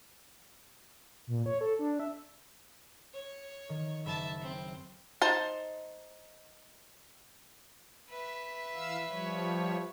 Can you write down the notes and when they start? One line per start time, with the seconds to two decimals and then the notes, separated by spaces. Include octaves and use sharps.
1.27 A#2
1.46 C#5
1.61 A4
1.79 D4
1.99 E5
3.13 C#5
3.69 D#3
4.06 F#1 E5 A5 B5
4.41 C4
5.22 D#4 C5 A5
8.10 B4 E5
8.74 E3 F5 E6
9.10 F3 G3 C#5